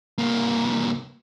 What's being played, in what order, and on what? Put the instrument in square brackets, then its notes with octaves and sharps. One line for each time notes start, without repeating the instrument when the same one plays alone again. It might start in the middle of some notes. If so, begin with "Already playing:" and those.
[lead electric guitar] C2 A#3